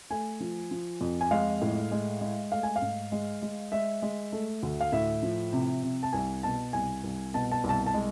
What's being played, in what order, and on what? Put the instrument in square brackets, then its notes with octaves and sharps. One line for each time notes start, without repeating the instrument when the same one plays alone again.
[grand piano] A3 G#5
F3
F3
F2
G#5
G#3 F5
A2
G#3
G#3
A3 F5
G#5
F5
G#2
G#3
G#3
G#3 E5
G#3
A3
D2
F5
A2 E5
F3
C3
C3
A5
C2 G#5
B2 A5
C2 G#5
C2
B2 A5
A5
C2
A5
A5
G#3